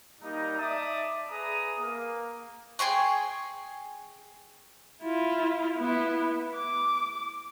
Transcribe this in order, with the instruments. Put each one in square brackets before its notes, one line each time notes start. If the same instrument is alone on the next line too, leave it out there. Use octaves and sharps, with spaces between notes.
[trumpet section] G3 A#3 D#4
D5 E5 A5 D6 D#6
G#4 B4 A#5 D#6
A#3
[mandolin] G#4 G5 C6 C#6
[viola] E4 F4
B3 E4
D6